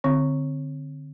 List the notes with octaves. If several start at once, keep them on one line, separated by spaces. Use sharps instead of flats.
D3 C4